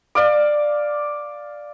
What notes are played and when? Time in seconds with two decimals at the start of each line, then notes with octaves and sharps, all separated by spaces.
0.15 D5 F5 D6